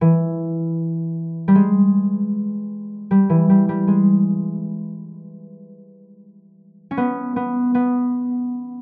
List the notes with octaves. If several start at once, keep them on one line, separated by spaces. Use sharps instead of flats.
E3
G3
G#3
G3
E3
G3
G3
G#3
C#4
B3
B3
B3